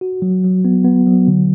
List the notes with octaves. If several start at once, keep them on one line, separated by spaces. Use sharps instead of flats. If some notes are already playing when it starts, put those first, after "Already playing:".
F#4
F#3
F#3
B3
B3
F#3
D3